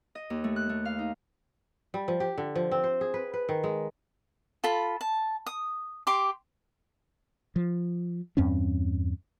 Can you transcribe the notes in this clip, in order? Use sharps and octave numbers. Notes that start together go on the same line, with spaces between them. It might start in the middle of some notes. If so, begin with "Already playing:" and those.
D#5
D#2
A3
F#6
A3
F5
D#4
G3
F3
G4
D3
F3
C4
C5
G#4
B4
B4
D#3
G#3
F4 A4 B5
A5
D#6
G4 C6 D6
F3
E2 G2 C4 C#4